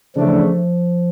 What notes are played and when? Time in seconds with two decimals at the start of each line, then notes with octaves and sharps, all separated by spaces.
0.16 C#3 E3 F3 A3 D4